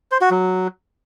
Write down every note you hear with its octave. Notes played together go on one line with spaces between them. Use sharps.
C5
F#4
F#3